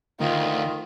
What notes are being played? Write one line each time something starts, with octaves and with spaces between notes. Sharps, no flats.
D2 D#3 F4